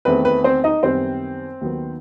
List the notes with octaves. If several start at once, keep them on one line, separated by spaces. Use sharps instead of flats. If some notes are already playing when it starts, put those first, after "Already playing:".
E2 D#3 A3 C4 B4
B4
C4 C5
D#4 D#5
F#2 D#3 G3 B3 C4 C5
D#2 D#3 F#3 B3